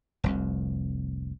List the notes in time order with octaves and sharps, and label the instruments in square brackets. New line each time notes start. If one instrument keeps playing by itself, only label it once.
[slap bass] F1 C2 F2